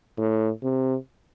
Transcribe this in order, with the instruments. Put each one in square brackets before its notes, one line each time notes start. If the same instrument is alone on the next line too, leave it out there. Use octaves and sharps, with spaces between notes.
[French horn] A2
C3